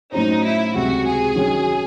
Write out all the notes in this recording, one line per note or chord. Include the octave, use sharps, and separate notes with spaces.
A2 F#3 C#4 D#4 F#4 C5
E4
C#2 C3 F#3 F#4
G#4
D#3 F#3 C#4